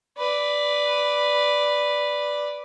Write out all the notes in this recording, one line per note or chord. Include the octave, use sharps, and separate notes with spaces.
B4 D5